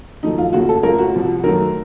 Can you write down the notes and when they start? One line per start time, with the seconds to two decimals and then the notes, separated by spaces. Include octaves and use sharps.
0.23 F2 D#3 F#3 A3 D#4
0.38 F4
0.53 D#2 C#3 A3 F#4
0.69 A4
0.83 C#2 C#3 A3 A#4
0.98 F#4
1.14 C2 C3 F3
1.44 F#2 D#3 A3 A#4